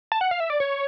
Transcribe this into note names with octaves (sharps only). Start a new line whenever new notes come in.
A5
F#5
F5
E5
D5
C#5